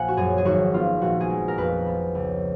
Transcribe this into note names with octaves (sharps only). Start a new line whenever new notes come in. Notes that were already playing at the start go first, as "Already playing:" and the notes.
Already playing: A#1 F#5 G#5
F#4
F#2 G#4
G#4
G#1 F#4
B3 F4
A#1 F#4
G#4
G#3
A#4
F2 B4
B3
C#2